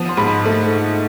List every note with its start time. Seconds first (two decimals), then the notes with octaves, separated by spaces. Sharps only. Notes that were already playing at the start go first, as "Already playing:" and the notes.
Already playing: F3 B3
0.09 C6
0.17 G#2 B5
0.46 A3